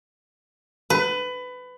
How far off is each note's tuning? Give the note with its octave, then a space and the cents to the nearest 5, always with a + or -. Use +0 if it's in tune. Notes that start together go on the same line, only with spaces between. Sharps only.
B4 +20